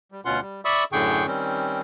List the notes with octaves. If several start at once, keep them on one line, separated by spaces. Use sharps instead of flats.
G3
D2 B2 C#4 F4 F#5 C6
G3
D5 E5 B5 C#6 D#6 E6
F#2 A2 D3 G#4 G5 C#6
D#3 G3 C4 C#4